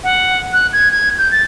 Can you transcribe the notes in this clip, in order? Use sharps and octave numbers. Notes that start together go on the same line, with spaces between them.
F#5
F#6
G#6
G#6
G6
A6